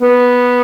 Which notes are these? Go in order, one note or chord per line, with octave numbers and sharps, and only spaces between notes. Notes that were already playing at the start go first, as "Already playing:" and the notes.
B3